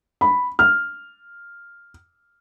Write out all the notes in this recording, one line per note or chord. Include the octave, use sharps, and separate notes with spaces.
B5
F6